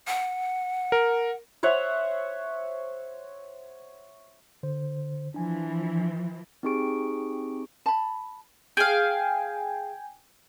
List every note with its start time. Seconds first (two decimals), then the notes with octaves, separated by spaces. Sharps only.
0.07 F#5
0.92 A#4
1.63 C5 C#5 E5 F#5
4.63 D3 C5
5.34 E3 F3 D4 G#5
6.63 C4 D#4 G4 G#4 C#6 D7
7.86 A5 B5
8.77 G#4 F5 G5 G#5